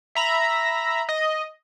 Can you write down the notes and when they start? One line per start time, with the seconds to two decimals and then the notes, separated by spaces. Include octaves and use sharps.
0.15 E5 A#5 B5
1.09 D#5